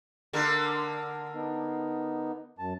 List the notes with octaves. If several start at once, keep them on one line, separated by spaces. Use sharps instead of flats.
D3 A#3 A#4
B3 D#4
F#2 A5